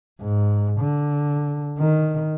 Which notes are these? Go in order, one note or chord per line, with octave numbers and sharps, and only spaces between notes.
G#2
D3
D#3